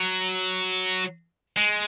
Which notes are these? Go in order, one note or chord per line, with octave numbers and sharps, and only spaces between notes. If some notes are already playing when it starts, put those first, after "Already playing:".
Already playing: F#3
G#3